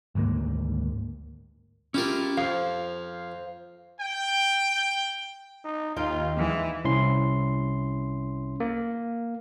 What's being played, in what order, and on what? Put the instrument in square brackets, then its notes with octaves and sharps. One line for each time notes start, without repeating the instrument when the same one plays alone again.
[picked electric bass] G#1 D2 G#2 A#3
[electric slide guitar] C#4 F4 [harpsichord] E4 G4 A#4
[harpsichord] F2 [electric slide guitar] C5 F5
[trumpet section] G5
[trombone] D#4
[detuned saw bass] D#2 [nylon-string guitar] D#4 F5 G5 [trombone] F4
[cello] E3 [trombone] G#3
[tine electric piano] C2 C#4 E4 C6
A#3